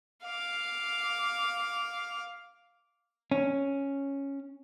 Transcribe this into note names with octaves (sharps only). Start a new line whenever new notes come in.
F5 D6
C#4